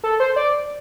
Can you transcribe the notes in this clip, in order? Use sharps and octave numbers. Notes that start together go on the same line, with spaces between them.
A4
C5
D5